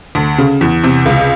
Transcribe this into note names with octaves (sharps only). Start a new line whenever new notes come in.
D2
C#3
E2
C3
C#2